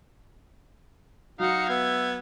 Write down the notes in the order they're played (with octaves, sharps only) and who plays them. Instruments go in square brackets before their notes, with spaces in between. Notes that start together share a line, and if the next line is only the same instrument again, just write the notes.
[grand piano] F#3 [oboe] D#4 [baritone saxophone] F#4 [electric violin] F5 C#7
[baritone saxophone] B3 [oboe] E5 [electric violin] G#6